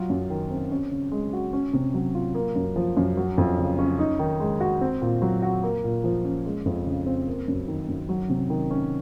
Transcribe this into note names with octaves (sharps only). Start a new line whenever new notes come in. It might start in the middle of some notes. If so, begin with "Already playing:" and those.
Already playing: F#3 F4
F#2
D#3
C4
C#4
C#3
G#3
F#4
C#4
C3
F#3
F4
A#3
F#2
F3
F#2
F#3
F2
C#3
C#4
D#4
D#3
G#3
F#4
C4
A#2
F#3
F#4
A#3
A#2
F3
C#4
G#3
F2
C#3
C4
A#3
F#2
D#3
F#2
F#3
C3
D#3
C#4